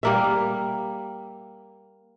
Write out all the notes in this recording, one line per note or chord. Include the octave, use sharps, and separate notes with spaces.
G3 A#3 E5